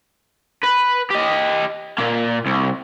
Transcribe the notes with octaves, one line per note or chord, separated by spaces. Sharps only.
B4
G4 D#5
A#2 A#3
C2